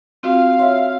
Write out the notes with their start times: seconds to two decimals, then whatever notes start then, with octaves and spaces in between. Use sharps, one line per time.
0.23 C4 F4 F#4 F5
0.59 F4 C#5 E5